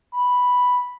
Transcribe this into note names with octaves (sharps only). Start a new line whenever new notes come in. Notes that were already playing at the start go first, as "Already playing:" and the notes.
B5